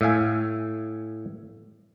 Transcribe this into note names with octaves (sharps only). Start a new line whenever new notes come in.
A2 E5 F5 G#5